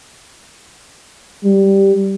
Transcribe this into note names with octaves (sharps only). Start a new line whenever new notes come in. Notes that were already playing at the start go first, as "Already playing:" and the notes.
G3